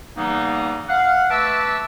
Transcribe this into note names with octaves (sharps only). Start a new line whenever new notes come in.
C#3 E3 G3 A#3 B3 D#4
F5 F#5
A3 B4 E5 A5 D6 E6